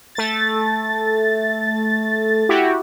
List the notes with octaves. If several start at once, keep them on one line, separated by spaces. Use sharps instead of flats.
A3 A6
E4 F#4 G4